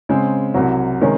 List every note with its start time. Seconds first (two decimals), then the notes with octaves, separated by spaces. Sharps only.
0.09 C#3 G#3 C4
0.54 C2 C3 F#3
1.00 C3 D#3 G#3 C#4